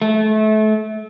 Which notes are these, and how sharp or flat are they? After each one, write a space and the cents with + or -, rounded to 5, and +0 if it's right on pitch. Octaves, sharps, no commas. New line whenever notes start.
A3 -30